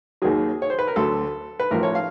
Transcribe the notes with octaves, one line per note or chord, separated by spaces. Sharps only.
D#2 D#3 F#3 G#4
C#5
C5
B4
A#4
D2 D3 F#3 A4
B4
A1 A2 F3 A#4
C#5
F5